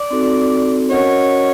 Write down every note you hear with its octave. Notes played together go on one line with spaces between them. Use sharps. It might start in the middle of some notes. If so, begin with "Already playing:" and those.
Already playing: D5
C4 D#4 F#4 A4
C#4 F#4 A#4 C#5 D#5 F#5